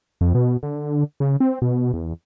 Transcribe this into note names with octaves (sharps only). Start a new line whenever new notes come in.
F2
B2
D3
C#3
C4
B2
E2